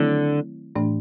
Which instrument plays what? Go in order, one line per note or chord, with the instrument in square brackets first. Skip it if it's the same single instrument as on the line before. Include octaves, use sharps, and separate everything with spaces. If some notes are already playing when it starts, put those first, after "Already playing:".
Already playing: [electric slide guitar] D3 [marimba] D#3 F#3 A3 C4 E4
[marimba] A2 E3 A3 D4